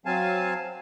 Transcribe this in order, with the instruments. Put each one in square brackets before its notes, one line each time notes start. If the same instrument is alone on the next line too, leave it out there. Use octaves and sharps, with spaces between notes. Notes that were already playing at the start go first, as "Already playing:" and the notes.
[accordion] F#3 C4 F5 G#5 A5